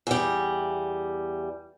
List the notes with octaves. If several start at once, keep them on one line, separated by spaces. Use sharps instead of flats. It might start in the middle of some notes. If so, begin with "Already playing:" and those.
E2 G3